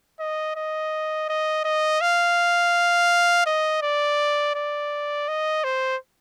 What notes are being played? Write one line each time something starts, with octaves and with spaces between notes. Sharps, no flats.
D#5
D#5
D#5
D#5
F5
D#5
D5
D5
D#5
C5